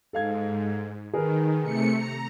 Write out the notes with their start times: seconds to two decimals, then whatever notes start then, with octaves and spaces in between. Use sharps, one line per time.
0.13 G#2 A4 F5 G#6
1.14 D#3 G#4 A#4 B4
1.62 C3 A3 C#7
1.95 A#5